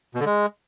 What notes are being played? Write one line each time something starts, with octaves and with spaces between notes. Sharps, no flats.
B2
D3
G#3